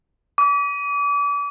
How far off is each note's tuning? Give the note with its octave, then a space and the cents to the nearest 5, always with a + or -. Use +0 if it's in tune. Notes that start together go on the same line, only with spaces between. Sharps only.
D6 -35